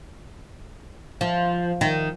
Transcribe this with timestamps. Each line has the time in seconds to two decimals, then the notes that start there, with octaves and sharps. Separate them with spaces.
1.21 F3
1.81 D#3